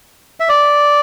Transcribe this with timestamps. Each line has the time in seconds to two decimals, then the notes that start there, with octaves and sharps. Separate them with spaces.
0.40 E5
0.49 D5